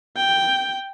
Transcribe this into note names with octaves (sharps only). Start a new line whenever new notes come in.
G5